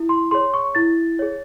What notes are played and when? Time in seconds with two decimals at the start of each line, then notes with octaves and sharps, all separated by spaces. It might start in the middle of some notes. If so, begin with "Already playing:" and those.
Already playing: E4
0.09 C6
0.31 G#4 C#5 C6
0.54 C#6
0.75 E4 A6
1.19 G#4 C#5